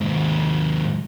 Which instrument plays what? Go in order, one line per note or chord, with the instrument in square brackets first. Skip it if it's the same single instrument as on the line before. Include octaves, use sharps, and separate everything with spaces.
[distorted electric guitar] D#2 G#2